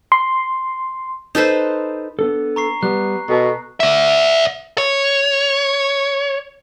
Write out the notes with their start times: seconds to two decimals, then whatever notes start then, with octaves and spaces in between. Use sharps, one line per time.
0.12 C6
1.35 D#4 A4 B4 C5
2.19 B3 D4 A4
2.56 A#5 C#6 C7
2.83 G3 B3 F#6
3.29 B2 A4 G#5 A5
3.80 D5 E5
4.78 C#5